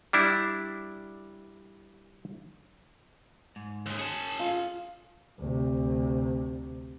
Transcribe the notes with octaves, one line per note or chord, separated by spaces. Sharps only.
G3 D4 E4
G#2
D#2 G#3
C#4 G#4 A5
F4 F5
D2 C3